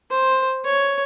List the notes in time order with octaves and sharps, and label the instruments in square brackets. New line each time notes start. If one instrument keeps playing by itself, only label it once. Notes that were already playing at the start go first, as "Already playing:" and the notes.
[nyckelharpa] C5
C#5